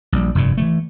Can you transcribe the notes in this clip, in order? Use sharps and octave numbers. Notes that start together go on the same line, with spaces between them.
A#1 G3
F1 G2 A#2
E3 F3 A3